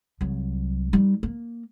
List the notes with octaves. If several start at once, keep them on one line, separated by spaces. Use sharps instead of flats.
C2 F#3
G3 D#4
A#3